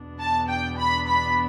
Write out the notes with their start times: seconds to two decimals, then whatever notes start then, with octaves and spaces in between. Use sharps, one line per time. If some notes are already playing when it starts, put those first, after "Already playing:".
Already playing: E2 B2 B3 D4
0.19 A5
0.48 G5
0.78 B5
1.07 B5